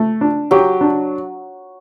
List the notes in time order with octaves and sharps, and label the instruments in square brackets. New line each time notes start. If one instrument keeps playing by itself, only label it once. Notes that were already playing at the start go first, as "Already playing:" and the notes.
Already playing: [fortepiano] A3
D4
[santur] F#3 [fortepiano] G4
[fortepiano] D4